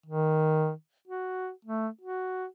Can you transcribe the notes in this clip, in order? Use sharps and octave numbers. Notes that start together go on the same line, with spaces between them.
D#3
F#4
A3
F#4